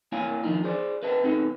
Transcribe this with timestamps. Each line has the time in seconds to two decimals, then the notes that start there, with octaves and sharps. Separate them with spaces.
0.12 A#3 E4 C#5 F5 G#5
0.43 D#3 F3 D4 D#4
0.64 G#4 C5 D5
1.03 B4 D#5 E5 A5
1.23 B3 C4 D#4 A4